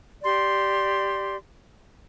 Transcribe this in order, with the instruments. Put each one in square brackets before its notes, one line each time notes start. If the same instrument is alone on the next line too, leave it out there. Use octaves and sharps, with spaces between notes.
[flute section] G4 D5 C6